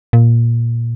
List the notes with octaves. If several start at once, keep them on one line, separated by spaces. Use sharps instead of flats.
A#2